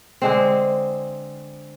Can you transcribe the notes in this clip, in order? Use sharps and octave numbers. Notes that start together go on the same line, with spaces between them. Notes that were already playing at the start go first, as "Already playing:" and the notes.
D3 G#3 C4